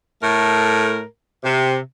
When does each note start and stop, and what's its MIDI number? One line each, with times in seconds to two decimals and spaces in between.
0.21 1.02 45
0.21 1.02 57
0.21 1.02 70
1.44 1.76 48